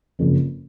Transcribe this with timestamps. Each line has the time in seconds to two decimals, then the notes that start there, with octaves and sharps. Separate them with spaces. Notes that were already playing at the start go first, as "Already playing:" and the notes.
0.19 F#1 F2 C#3